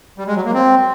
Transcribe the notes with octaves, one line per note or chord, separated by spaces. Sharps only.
G3
G#3
F#3
A#3
C4